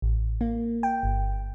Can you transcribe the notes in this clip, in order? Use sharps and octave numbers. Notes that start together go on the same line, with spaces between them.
A1
A#3
G5
G1